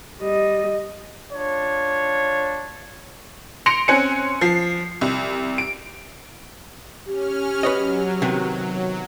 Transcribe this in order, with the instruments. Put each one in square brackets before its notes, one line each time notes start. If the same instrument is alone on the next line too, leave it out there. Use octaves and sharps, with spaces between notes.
[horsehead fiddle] G3 D#5
[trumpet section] D4 F4 C#5
[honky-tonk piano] C6 A#6 C#7 D7 F7
C4 C#4 C5 G#5 F#6 C#7
F3 C7
C2
D7
[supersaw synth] C#4 F6 [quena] G4
[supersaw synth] F#3 [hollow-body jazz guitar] B4 C#5 D#5
[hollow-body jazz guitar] C3 D#3 B3